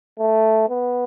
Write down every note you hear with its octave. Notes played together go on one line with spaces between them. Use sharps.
A3
B3